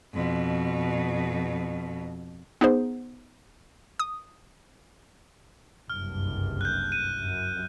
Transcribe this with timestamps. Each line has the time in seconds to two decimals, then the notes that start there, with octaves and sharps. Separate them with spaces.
0.13 F2 B2
2.61 B3 D#4 G#4 C5
3.99 D#6
5.90 F#1 C2 G2 F6
6.61 F#6 G6
6.92 D#7
7.21 F#2